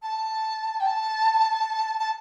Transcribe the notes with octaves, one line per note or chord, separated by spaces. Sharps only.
A5
G5
A5
A5